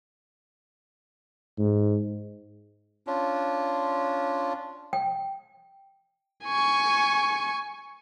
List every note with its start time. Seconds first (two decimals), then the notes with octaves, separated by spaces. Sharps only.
1.58 G#2
3.07 C#4 D4 F4
4.93 G5
6.45 G#5 C#6